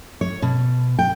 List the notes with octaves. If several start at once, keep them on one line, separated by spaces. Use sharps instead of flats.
C#5
B2
G5